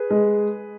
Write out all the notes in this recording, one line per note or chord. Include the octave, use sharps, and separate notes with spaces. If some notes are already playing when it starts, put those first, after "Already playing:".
Already playing: G#4 B4
G#3